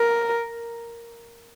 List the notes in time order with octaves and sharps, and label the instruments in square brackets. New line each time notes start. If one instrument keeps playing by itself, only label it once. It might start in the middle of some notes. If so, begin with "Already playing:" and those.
Already playing: [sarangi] A#4